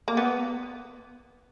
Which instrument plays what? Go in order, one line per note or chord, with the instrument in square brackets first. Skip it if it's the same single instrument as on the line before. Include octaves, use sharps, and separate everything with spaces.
[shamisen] A#3
B3